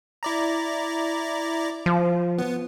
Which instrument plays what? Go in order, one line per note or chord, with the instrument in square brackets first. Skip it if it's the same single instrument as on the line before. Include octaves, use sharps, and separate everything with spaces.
[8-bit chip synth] E4 D5 A#5
[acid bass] F3
[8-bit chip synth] B3